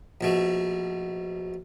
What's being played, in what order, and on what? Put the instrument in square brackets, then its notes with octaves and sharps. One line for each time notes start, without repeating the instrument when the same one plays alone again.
[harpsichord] A#1 B2 A3